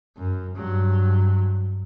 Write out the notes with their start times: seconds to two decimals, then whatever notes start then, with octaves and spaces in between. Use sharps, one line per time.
0.17 F#2
0.55 G2 F#3